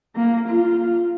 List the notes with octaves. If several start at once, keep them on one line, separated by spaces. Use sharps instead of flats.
A#3
F4